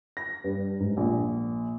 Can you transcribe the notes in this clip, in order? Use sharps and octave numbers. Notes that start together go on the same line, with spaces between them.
A#6
G2
G#2
A#1